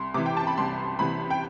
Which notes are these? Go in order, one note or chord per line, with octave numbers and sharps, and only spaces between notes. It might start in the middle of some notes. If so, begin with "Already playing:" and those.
Already playing: C2 C6
C3 E3 D6
G5
A5
B5
C2 C6
C3 E3 B5
G5